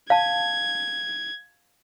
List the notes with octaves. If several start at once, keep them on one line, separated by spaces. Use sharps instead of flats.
F5 A5 G#6